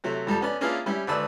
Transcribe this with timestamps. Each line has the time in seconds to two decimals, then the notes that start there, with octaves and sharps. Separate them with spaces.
0.04 C3 F#3 A3
0.27 F2 G3 A4 A5
0.41 B3 C#4 D5
0.61 A#3 C#4 D4 E4 F4 G#4
0.86 G3 C#4 E4 G4
1.07 G#1 D3 B4 D5 E6